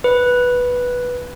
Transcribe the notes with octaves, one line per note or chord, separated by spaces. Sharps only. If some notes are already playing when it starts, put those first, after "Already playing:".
B4